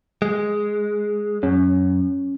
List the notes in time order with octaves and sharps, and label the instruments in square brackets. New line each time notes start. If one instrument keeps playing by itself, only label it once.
[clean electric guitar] G#3
[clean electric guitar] F#2 [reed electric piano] C#4